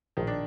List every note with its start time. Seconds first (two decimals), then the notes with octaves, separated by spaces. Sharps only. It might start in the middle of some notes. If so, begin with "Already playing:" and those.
0.17 A#1 A2 D#3 F3
0.27 D4